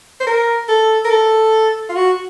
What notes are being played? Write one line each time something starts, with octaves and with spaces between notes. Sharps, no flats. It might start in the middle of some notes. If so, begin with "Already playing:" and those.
C5
A#4
A4
A#4
A4
F4
F#4